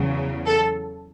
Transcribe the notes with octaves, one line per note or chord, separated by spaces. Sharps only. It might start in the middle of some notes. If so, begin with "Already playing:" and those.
Already playing: E2 C#3 F#3
A4